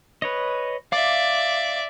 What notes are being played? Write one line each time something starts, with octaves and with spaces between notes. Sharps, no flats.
B4 C#5 D#5
D5 E5 F5 D6